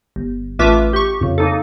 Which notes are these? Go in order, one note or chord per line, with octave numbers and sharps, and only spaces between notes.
G1
A1 A3 F4 B4 E5 D6
G4 C#6
F2 C#3
A#3 D#4 A4